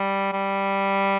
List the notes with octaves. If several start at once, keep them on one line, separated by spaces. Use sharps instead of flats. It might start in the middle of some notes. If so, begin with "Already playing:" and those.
Already playing: G3
G3